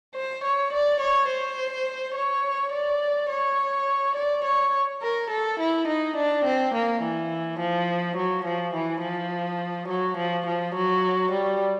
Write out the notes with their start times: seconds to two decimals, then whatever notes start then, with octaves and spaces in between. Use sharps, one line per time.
0.15 C5
0.44 C#5
0.73 D5
1.00 C#5
1.29 C5
2.15 C#5
2.72 D5
3.30 C#5
4.16 D5
4.44 C#5
5.02 A#4
5.30 A4
5.60 E4
5.87 D#4
6.16 D4
6.45 C4
6.74 A#3
7.03 E3
7.59 F3
8.17 F#3
8.45 F3
8.74 E3
9.02 F3
9.88 F#3
10.17 F3
10.46 F3
10.75 F#3
11.32 G3